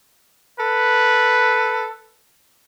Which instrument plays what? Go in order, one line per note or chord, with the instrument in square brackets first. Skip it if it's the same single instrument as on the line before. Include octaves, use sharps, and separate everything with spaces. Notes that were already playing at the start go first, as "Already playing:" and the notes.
[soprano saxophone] A4 [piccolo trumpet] B4